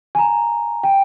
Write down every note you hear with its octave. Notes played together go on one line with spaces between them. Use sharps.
G#5
A#5
G5